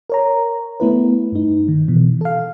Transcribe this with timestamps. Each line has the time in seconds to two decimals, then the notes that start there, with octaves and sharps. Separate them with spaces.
0.10 A#4 C#5 A#5
0.80 A3 B3 E4 B4
1.32 G2 D#4
1.68 D#3
1.88 B2 E3
2.21 A4 F5